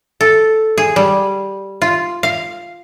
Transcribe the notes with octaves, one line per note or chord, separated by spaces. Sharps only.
A4
G#4
G3
F4
F5